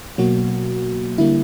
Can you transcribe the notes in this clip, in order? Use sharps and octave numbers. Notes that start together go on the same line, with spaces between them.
B2 F#3 A#3 F#4
D3 G3 A#3 E4